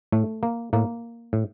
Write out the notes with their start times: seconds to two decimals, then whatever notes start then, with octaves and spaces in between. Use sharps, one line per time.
0.12 A2 A3
0.43 A#3
0.73 A2 A#3
1.33 A2